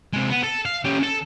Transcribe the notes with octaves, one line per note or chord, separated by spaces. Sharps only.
C3 G#3
B3
A4
F5
C#4 G4
A4